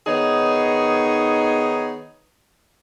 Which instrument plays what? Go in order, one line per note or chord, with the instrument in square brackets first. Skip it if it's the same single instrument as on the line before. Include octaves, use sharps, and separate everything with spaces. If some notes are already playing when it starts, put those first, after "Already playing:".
[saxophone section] D#3 B3 D#4 G#4 C#5